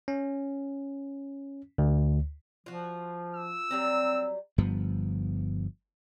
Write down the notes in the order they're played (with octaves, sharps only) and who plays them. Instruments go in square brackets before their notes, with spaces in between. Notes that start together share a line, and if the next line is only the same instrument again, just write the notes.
[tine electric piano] C#4
D2
[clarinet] F3 [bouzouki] F4 F#4
[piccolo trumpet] E6
[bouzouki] F#3 G3 A#5 [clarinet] C4
[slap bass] G1 G2 F3 B3